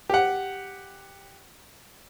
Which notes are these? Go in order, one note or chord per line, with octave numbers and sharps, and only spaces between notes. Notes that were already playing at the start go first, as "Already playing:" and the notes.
G4 F#5